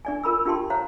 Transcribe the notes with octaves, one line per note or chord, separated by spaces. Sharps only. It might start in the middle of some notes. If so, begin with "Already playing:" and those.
D4 D5 G#5
F4 A#4 B5 E6
D4 F4 G4 G5 A5 C6
C5 C#5 F5 A#5